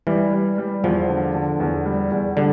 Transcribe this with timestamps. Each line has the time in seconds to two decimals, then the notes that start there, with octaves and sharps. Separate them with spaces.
0.07 E3 G3
0.33 G3
0.58 G3
0.84 E2 F3
1.09 D3
1.35 D3
1.60 E2
1.86 G3
2.12 E2
2.37 D3 G3